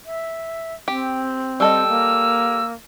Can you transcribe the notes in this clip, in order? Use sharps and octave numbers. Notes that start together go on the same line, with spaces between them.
E5
C4 G4
G3 A4 D#5 E6
A#3